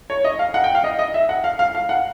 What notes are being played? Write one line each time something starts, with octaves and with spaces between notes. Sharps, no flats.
C#5
D#5
F5
F#5
G5
F5
D#5
D#5
E5
F#5
F5
F5
F5
F#5